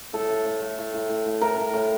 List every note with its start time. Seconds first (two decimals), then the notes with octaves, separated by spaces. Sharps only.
0.13 A2 A4
0.30 A2
0.46 A2
0.61 A3
0.78 A2
0.94 A2
1.09 A2
1.26 A2
1.41 A2 A#4
1.57 A2
1.74 A2